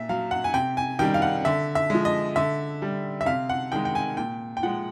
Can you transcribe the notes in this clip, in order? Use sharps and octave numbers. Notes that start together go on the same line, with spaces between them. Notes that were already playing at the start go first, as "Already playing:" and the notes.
Already playing: A#2 E5
F#3 F5
F#5
G#5
C3 G5
G#5
D#3 G3 G5
F5
F#5
D3 E5
E5
F3 G#3
D#5
D3 E5
G3
E5
C3 F5
F#5
D#3 G#3 G5
G5
G#5
A#2 G5
G5
F3 G#3 F#5